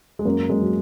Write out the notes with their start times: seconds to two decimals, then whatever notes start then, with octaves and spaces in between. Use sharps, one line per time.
0.19 G#3
0.25 F#2 A#3
0.49 F#2 G#3
0.62 F#3